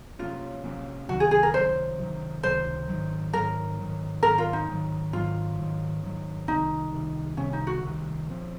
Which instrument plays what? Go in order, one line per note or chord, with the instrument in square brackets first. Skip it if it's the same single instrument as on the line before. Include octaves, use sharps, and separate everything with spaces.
[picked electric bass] C3 F#3 A#3 C#4 [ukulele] F4
[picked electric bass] C3 F#3 A#3 C#4
[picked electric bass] C#2 C3 D#3 F#3 [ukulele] F#4
[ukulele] G#4
G#4
A#4
[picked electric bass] C#2 C3 D#3 F#3 [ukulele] C5
[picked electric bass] C#2 C3 D#3 F#3
[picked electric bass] C#2 C3 D#3 F#3 [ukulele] C5
[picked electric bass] G#2 D#3 F#3
[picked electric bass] G#2 D#3 F#3 [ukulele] A#4
[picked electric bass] G#2 D#3 F#3
[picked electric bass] G#2 D#3 F#3 [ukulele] A#4
[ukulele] F4
D#4
[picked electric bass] G#2 D#3 F#3
[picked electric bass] G#2 D#3 F#3 [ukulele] F4
[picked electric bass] G#2 D#3 F#3
G#2 D#3 F#3
[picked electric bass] C2 C3 D#3 [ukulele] D#4
[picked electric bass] C2 C3 D#3
[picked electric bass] C2 C3 D#3 [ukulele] C#4
[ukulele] D#4
F#4
[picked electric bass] C2 C3 D#3
A#2 F3 C4